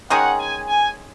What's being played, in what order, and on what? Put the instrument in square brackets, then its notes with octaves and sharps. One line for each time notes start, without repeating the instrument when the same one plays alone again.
[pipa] D#3 G#3 C#4 G#4 [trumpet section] F#5
[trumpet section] G#5
G#5